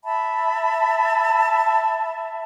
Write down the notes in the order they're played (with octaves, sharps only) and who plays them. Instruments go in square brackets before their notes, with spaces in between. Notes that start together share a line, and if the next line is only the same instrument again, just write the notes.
[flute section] E5 A5 B5